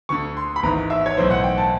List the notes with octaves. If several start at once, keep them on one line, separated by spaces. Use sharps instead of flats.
D2 D3 C#6
C6
B5
G#1 G#2 E3 A#5
E5
C#5
B1 A2 E3 C5
F#5
G5
A5